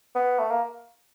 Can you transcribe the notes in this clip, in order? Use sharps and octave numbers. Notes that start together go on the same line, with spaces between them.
B3
A3
A#3